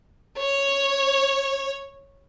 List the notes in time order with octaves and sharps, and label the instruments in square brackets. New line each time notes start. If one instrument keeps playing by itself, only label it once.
[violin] C#5